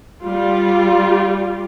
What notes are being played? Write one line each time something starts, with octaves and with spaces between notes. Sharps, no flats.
G3 F4